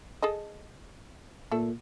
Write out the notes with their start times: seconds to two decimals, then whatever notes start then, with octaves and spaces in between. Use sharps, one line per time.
0.22 G#4 A4 D#5
1.51 A#2 A3 A4